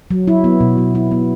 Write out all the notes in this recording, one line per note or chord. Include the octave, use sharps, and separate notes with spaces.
F#3
E4
B3
B2
F#3
E4
B3